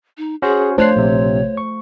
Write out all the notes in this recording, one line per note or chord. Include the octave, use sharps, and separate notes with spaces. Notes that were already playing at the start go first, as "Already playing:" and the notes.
D#4
C#4 F#4 G#4 C5
A3 D4 F4 C5 C#5 F#6 C7
A#1 C3
C#6